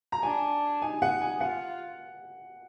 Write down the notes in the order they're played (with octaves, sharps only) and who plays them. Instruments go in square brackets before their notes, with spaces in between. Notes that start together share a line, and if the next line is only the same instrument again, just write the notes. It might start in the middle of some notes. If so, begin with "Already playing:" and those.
[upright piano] A#5
[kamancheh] D4 [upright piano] G#5
[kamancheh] D#4 [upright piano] G#5
[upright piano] F#5
G#5
[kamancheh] F4 [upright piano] F#5